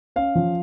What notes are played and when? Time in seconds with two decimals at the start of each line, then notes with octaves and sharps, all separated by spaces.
0.16 C#4 F5
0.35 F3